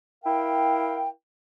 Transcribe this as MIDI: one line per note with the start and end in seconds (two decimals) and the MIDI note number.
0.24 1.09 64
0.24 1.09 70
0.24 1.09 77
0.24 1.09 79